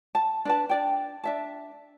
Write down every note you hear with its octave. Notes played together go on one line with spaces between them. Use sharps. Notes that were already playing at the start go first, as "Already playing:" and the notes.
A5
D4 B4 A5
D4 D5 G5
D4 E5 A5